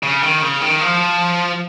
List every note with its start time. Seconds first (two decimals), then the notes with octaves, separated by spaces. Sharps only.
0.03 C#3
0.23 D#3
0.42 C#3
0.61 D#3
0.81 F3